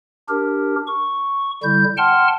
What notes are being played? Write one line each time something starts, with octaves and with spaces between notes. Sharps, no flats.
D4 G4 A#4
C#6
D3 G3 E4 G6
F#5 G5 A5 C6 F6